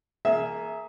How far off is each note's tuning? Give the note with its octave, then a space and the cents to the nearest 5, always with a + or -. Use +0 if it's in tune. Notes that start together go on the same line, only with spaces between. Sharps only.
A#3 +0 G#4 +25 E5 +0